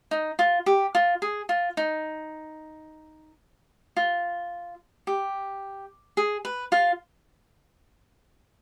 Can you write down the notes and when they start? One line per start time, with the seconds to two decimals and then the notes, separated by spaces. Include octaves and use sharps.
0.11 D#4
0.39 F4
0.66 G4
0.95 F4
1.22 G#4
1.49 F4
1.77 D#4
3.96 F4
5.07 G4
6.17 G#4
6.45 B4
6.72 F4 F5